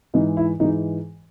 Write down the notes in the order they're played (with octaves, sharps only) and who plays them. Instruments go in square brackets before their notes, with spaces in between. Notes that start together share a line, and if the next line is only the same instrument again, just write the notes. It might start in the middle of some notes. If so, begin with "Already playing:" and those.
[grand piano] G#2 E3 G#3 D#4
E4
G#2 E3 G#3 D#4